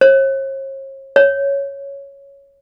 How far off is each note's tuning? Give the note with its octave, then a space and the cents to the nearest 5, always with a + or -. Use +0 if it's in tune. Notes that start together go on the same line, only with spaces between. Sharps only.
C#5 -45
C#5 +0